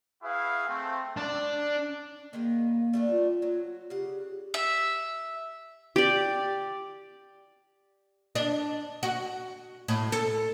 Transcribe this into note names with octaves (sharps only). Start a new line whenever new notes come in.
E4 F#4 G#4 B4 F5
A3 C4
D4
D#3 G#3 A#3 B3
G3 A3 D4
F4
F#3
C#3 G4 F#5
E5
G4 D5
D4
F#4
A2
A4